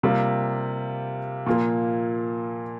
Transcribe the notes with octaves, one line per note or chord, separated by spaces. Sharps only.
C3 G3 A#3 F4
A#2 F3 A#3